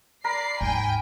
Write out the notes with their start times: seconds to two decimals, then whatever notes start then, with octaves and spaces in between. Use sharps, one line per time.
0.24 A#4 D5 A#5 B5 C7
0.61 D#2 G#2 G5 G#5